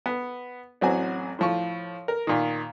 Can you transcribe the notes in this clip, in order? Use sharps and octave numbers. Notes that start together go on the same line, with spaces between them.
B3
A1 F#3 C4 F#4 G#5
A2 F3 C#6
A#4
A#2 D#3